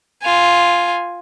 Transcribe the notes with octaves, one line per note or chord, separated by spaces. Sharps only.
F4 G#5